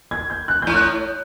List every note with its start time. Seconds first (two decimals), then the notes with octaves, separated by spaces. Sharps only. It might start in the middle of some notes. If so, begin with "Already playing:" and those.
0.11 G#6
0.30 G6
0.48 F#6
0.62 A2 G6
0.75 F#6